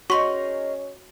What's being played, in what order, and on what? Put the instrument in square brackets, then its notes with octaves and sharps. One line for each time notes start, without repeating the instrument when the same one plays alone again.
[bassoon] C#4 [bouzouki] D#4 G#4 A#4 [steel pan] F#4 [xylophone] C6 C#6